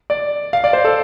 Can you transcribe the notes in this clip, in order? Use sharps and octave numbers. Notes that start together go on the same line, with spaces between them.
D5
F5
D5
C5
A4